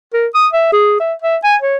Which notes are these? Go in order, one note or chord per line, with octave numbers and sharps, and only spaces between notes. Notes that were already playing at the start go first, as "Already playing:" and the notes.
A#4
D#6
E5
G#4
E5
E5
G#5
C#5